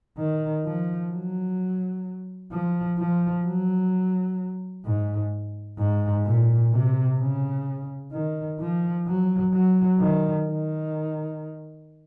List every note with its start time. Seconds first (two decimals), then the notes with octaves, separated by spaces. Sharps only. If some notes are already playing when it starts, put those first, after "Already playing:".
0.18 D#3
0.65 F3
1.11 F#3
2.52 F3
2.99 F3
3.45 F#3
4.85 G#2
5.79 G#2
6.25 A#2
6.73 C3
7.20 C#3
8.12 D#3
8.60 F3
9.07 F#3
9.53 F#3
9.99 D#3
10.47 D#3